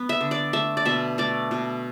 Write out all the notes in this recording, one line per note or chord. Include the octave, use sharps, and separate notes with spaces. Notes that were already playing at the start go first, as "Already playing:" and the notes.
Already playing: B3
E5
D3
D5
A3 E5
D5
B2 E5
A3 D5
B2